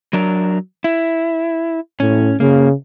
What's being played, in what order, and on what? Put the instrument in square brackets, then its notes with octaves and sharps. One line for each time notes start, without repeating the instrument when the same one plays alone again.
[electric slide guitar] F#3 D4 A#4
E4
[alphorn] A2 [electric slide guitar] C#4
[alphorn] C#3 [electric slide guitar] A#3